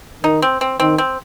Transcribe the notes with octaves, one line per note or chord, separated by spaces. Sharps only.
D#3 D#4
C4
C4
D#3 C4
C4